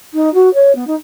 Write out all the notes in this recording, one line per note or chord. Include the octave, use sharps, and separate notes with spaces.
D#4
F#4
C#5
B3
D#4